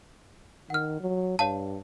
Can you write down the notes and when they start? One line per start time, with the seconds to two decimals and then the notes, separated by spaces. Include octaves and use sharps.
0.70 D#3 F#5 F6
1.00 F#3
1.39 G2 C#5 F5 A5